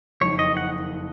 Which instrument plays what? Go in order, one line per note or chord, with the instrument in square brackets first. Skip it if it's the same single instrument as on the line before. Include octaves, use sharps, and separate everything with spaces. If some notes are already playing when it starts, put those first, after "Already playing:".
[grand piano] F#1 F2 D#3 [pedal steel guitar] C#5
[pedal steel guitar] D#5
F#5